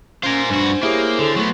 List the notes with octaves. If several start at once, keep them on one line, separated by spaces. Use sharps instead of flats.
C#4 F4 A#4 C5 G#5
G2 D4 F#4
A#3 E4 G4 G#4 C#5
D3 A4
F#3 A3 B3